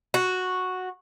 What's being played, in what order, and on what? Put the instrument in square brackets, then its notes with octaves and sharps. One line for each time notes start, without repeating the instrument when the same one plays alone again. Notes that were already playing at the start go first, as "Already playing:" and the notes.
[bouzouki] F#4